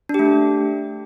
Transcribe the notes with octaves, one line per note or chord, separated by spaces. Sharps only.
A3 D4 G4